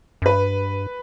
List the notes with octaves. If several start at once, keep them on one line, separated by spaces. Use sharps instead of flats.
F#2
G2 B4